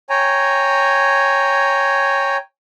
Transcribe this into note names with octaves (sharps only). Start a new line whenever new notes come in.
C#5 G5 G#5 A#5